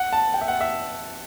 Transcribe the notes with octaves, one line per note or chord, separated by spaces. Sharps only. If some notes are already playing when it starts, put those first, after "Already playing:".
Already playing: F#5
A5
G5
E5
F#5
E5